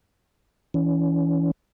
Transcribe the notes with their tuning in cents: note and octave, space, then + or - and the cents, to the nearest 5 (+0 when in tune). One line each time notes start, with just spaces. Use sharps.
E3 +0 C#4 +30